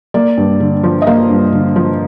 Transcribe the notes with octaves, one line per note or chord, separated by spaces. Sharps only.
A#3 D5
G2
D3
F3
D#5
A#3 F5
G2
D3
F3